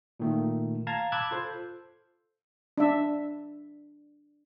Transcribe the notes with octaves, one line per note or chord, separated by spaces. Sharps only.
A#2 D#3 A3
F5 A5 A#5 G#6 A6
A5 B5 D6 E6 F#6 G#6
F4 A4 C5
D4 E5